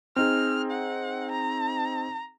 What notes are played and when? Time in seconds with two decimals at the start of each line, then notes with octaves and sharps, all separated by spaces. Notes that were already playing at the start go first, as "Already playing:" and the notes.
0.16 C4 D#4 G#4 F6
0.71 F#5
1.31 A#5